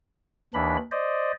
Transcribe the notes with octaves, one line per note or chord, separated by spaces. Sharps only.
D#2 E3 D4 B5
C5 D5 D#5